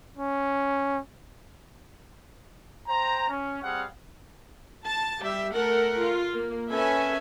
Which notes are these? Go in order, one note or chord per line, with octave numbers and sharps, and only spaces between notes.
C#4
C5 G5 A#5
C#4
G3 C4 G#4 F5 F#5
A5
G3 G4 E5
A3 A4 A#4 F#5
F4
A#3
C#4 A4 B4 E5 G#5